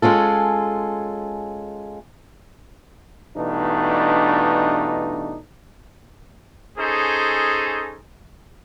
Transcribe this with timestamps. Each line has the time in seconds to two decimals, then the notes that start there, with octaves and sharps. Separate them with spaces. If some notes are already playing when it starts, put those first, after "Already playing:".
0.02 G#3 C#4 F4 A4
3.37 G2 B2 E3 A3 D4 D#4
6.78 C#4 D#4 G#4 A4 C5